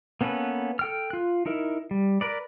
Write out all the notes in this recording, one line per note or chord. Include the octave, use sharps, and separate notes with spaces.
A#3 B3 C#4 A4 B4
A4 G5 F6
F4 F#6
D#4 E4 A#4
G3
A#4 B4 D5